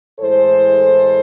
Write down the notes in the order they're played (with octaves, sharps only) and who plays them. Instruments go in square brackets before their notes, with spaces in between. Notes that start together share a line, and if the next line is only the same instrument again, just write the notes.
[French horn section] A2 E3 G#3 A4 C5